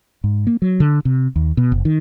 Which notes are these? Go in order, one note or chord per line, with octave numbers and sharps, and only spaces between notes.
G#2
A#3
F#3
D3
C3
D#2
B2
F#1
D#3